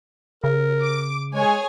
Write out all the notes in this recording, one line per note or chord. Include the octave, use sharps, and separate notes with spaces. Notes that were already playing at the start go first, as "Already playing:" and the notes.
C#3 A#4
D6
G#3 G#4 C#5 G#5